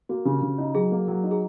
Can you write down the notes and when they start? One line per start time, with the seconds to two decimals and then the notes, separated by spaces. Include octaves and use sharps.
0.09 A#3 F#4
0.25 C#3 G4
0.42 C#3
0.58 D#4
0.75 F#3 G#4
0.92 A#3
1.08 F#3
1.24 D#4
1.31 G#4